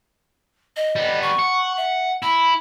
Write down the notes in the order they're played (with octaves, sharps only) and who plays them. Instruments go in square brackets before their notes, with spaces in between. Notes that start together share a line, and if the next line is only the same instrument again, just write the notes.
[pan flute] D#5
[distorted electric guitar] G3 B3
[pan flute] C#6
[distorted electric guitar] F#5
[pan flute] E5
[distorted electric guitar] E4 [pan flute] B5